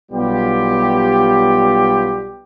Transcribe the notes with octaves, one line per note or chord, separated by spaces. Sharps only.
B1 G3 B3 F4 G4